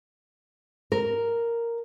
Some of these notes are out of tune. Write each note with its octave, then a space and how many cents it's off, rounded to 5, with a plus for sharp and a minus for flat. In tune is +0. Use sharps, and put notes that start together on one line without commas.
A#4 +0